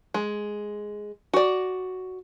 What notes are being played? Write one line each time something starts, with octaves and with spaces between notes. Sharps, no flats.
G#3
F#4 D5